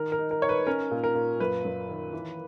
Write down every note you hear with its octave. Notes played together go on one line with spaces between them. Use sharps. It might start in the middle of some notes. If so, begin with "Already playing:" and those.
Already playing: D#3 A#4
A#4
D#4
A#4
D#4 C#5
B4
C#4 A#4
A#2
A#4
A#2
F#2 B4
F#2
D#3
E3